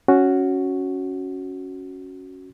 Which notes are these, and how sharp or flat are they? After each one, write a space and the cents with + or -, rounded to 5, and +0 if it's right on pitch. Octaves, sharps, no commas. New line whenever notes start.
C#4 +0 F#4 +0